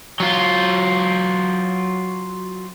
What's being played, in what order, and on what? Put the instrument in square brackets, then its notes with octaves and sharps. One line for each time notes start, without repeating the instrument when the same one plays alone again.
[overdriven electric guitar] F#3 F4